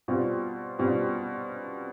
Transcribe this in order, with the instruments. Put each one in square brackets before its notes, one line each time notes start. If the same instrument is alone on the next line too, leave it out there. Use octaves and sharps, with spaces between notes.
[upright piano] B2 G3 C4 F4
B2 G3 C4 F4